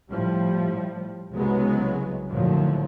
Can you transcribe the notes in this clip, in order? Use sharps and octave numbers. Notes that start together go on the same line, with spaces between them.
A2 F3 G3
C2 C#3 F#3 G#3 B3
D#2 A2 D3 F3 F#3